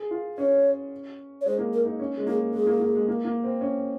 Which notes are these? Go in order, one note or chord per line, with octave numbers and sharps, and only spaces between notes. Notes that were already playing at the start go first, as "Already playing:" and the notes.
Already playing: G#4
F4
C#4 C#5
C#5
G#3 C5
A#3
A#4
D#4
C#4
G#3
A#3 G#4
G#3 G#4
A#3
A#3
G#3
A#3
A#3
C4
C#4